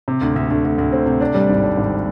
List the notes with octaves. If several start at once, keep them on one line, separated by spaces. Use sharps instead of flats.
C3
D2
D2
D2
D2
D2
C4
C3
D4
G3
G#1
D4
G#1